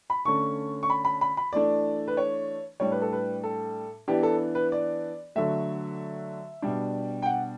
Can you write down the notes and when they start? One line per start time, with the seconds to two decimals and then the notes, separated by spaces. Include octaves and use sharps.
0.10 B5
0.25 D3 A3 C#4 C#6
0.83 C#6
0.90 B5
1.05 B5
1.21 B5
1.37 B5
1.53 E3 A3 D4 D5
2.08 B4
2.17 C#5
2.80 A2 G3 D4 C#5
2.92 B4
3.02 A4
3.12 B4
3.44 A4
4.08 E3 B3 D4 G4
4.23 A4
4.55 B4
4.72 D5
5.36 D3 F#3 A3 E5
6.62 B2 G3 D4
7.22 G5
7.26 F#5